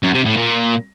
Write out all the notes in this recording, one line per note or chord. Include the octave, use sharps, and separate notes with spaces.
F#2
C3
A2
A#2